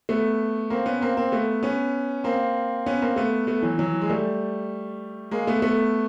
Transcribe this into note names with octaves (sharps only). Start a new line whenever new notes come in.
A3 B3
A#3 C4
B3 C#4
A#3 C4
A#3 C4
A3 B3
B3 C#4
A#3 C4
B3 C#4
A#3 C4
A3 B3
A3 B3
E3 F#3
E3 F#3
G#3
G3 A3
G#3 A#3
A3 B3
A3 B3